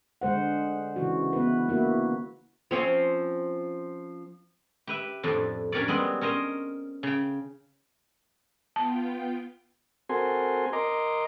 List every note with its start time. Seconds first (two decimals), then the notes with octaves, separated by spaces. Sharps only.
0.21 D3 G#3 C5 F#5
0.96 C#3 E3 F#4
1.33 B3 E4 B4
1.69 A#3 E4 F#4
2.71 F3 C4 C#4
4.87 G4 B4 E5
5.23 F2 A2 D4
5.72 C#4 D4 G4 A#4 C#5 D5
5.88 G3 G#3 B3 C4
6.21 C#4 A#4 C5 D#5
7.03 C#3 G5
8.76 B3 F4 G5 A5
10.09 C4 F#4 A4 A#4 G#5 C6
10.73 A#4 D#5 A#5 C6 D6